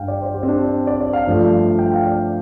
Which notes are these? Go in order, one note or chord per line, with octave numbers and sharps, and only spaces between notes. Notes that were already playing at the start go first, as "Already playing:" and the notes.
Already playing: G2 G3 F5 G5
D5
C5
G4
C4
D4
D5
D5
F5
G2 F3 A3
G5
F5
D5